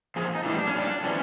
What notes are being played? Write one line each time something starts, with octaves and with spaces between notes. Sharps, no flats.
A#2 F3 G#4
D#4
A2 E3 G3 D4
D4
C#4
A#2 G3 D4
C3 E3 G3 C#4